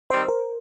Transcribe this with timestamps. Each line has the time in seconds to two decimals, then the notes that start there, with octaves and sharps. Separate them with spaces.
0.10 D#3 G3 C4 C5
0.28 A#4